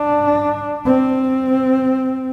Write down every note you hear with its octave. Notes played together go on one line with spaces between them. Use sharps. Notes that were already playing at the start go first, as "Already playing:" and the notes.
Already playing: D4
C4